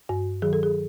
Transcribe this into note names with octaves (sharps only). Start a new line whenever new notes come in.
G2 F#4
D#3 F#3 G#4
A4
G#4